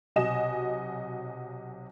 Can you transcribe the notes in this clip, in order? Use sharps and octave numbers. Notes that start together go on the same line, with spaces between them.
B1 C3 F#4 D#5 G#5 E7